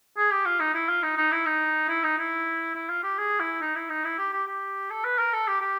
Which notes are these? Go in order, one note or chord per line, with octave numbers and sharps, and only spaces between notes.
G#4
G4
F4
D#4
E4
F4
D#4
D#4
E4
D#4
E4
D#4
E4
E4
F4
G4
G#4
E4
D#4
E4
D#4
E4
G4
G4
G4
A4
B4
A#4
A4
G4
G4